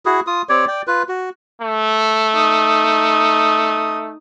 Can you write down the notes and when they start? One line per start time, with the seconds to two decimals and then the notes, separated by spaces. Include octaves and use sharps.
0.06 E4 F#4 G#4
0.27 F4 D#6
0.49 C4 G4 C#5 D5
0.68 D5 G5
0.87 F4 B4
1.09 F#4
1.61 A3
2.33 D#4 D#6